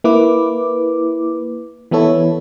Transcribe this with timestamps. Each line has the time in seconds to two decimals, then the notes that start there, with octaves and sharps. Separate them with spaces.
0.04 A#3 E4 B4 D6
1.91 E3 B3 E4 A4 C#5